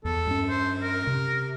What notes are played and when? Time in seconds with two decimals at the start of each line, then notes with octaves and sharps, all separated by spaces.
0.05 E2 A4
0.27 G2 C#4
0.49 C5
0.82 A#4
1.07 C3